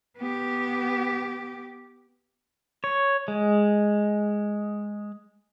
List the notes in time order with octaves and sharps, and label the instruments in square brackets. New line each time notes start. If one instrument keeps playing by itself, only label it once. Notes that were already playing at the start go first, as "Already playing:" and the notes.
[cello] B3 G4
[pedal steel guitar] C#5
G#3